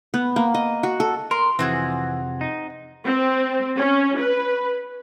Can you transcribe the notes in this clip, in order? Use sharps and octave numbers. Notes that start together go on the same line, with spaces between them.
B3
A#3
D#5
F#4
A4
A#4 C6
F2 C3 E3 C4 F#4 G#4
D#4
C4
C#4
B4